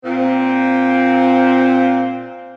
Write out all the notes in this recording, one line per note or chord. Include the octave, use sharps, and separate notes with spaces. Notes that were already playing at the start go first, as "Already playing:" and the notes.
A#2 C4